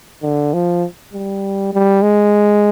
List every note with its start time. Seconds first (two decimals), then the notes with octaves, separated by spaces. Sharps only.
0.23 D3
0.53 F3
1.13 G3
1.73 G3
2.02 G#3